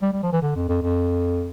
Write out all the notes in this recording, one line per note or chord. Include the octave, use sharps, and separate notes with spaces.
G3
G3
F3
E3
D3
F2
F2
F2